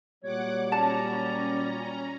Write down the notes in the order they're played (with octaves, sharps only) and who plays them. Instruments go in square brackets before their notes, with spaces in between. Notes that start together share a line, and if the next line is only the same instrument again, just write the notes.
[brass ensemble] A#2 F#3 G3 [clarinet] C#5 [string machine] F#5 D6
[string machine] C#4 A#5 [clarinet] D5 [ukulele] A5